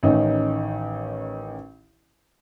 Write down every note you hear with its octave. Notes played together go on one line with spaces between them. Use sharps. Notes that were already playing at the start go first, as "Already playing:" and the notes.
A1 D#3 C#4 D#4